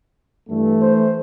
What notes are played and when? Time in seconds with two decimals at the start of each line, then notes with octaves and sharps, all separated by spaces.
0.50 G2 E3 A3
0.82 C5